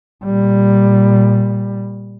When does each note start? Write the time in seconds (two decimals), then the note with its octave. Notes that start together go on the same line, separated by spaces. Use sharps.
0.24 A#2 G3